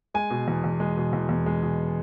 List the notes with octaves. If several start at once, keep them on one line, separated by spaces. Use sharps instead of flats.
G#3 G#5
B2
E2
E2
G#3
B2
E2
E2
G#3
B2